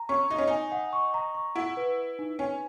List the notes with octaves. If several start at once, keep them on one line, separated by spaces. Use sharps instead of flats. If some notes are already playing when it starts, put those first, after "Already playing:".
Already playing: A#5
C#4 C#6
D#4 D#5
C#4
D#4 G#5
F#5
C#6
A#5
C#6
E4 F#5
B4
B4
D#4
C#4 G#5